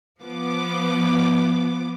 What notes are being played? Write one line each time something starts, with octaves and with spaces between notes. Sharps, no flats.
F3 B3 D6